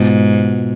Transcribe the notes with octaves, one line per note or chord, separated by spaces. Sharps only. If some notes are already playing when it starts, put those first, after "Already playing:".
Already playing: G#2 B2 B3 F4